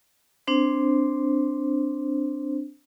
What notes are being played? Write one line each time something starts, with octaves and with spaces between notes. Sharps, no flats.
C4 D4 C5